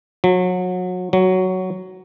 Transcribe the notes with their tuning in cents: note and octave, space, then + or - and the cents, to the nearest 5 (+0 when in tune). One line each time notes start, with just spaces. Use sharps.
F#3 -30
F#3 +5